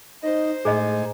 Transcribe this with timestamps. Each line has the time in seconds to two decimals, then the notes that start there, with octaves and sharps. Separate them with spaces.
0.23 D#4 C5 D#5
0.65 A2 G#3 D#4 G#4 D#5 G#5